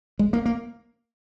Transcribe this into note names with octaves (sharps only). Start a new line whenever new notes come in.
G#3
A#3
A#3